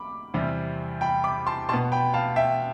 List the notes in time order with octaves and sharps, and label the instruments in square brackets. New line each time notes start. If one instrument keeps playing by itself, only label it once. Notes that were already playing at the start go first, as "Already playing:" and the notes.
Already playing: [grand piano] B5 D6
E2 C3 G3 C4
G5 B5
B5 D6
A5 C6
B2 B3 A5 C6
G5 B5
F5 A5
E5 G5